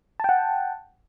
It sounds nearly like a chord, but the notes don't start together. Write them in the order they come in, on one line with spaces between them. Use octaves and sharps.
A5 G5 F#5